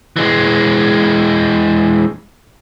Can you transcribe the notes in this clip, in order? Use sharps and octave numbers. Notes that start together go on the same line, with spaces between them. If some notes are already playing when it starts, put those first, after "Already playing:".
E3 G#3